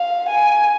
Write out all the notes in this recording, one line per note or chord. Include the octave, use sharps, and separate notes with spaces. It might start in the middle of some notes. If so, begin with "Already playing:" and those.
Already playing: F5
G#5